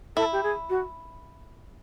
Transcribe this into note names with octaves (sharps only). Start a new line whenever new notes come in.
E4 A4
G4
G#4
F#4